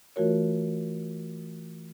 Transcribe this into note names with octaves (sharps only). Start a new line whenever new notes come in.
E3 A3 F4 F#4 A#4 C#5